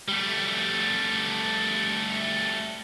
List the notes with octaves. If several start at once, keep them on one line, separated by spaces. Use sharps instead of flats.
G3 A3